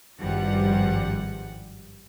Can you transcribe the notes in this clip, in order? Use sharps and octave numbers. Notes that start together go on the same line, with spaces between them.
G#1 G2 F3 G3 F#5